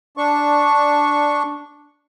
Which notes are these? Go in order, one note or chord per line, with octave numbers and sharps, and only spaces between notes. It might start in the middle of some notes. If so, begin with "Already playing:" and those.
D4 C#6